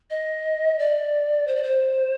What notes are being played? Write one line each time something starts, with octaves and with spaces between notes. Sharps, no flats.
D#5
D5
C5
D5
C5